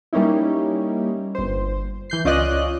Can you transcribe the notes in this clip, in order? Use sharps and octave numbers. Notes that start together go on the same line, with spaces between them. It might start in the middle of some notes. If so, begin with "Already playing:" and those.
G3 A#3 C#4 D#4 E4
G1 C5
E3 G6 C7
C#2 C#4 F4 D5 D#5 F#6